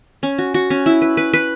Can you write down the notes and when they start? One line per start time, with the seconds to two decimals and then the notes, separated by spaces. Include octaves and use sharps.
0.23 C#4
0.38 F#4
0.54 F#4
0.70 C#4
0.86 E4
1.02 B4
1.17 B4
1.34 B4